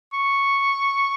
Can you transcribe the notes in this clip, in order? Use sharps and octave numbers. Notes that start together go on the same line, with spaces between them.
C#6